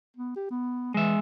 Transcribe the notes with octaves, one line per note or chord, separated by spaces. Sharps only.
B3
G4
B3
E3 G#3 E5